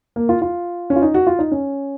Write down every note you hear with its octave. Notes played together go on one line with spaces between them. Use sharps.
A#3
F4
F4
C#4
F4
D#4
F#4
F4
D#4
C#4